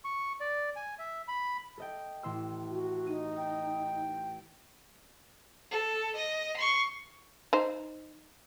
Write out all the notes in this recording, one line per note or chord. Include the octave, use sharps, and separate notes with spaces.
C#6
D5
G#5
E5
B5
A4 D#5 G5
A1 C6 E6
F#4
D#4 D#7
G5
A4
D#5
C6 C#6
D#4 C5